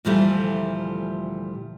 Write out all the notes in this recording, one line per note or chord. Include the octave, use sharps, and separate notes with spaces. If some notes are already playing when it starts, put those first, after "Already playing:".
D2 A#2 E3 F3 G3 A3